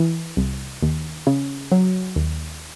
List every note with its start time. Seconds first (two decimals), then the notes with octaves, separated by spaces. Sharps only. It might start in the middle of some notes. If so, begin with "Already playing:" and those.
Already playing: E3
0.37 C2
0.83 D#2
1.27 C#3
1.72 F#3
2.16 D#2